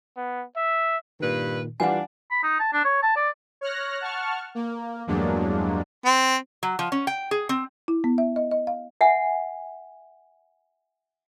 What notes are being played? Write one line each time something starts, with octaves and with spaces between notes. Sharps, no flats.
B3
E5
G2 A#2 D#3 B4
E3 G3 D4 F4 F#5 G#5 C7
B5
D#4
A5
D4
C#5
A5
D5
C#5 F6 F#6 A#6
F#5 A5 C#6 F6
A#3
E2 G2 F#3 G#3 A#3 D4
C4
F#3
F3
C#4
G5
G#4
C4
E4
B3
E5
D#5
D#5
F5
E5 F#5 G#5